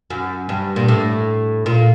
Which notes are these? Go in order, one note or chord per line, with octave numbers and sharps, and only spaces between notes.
F#2
G2
A#2
A2
A#2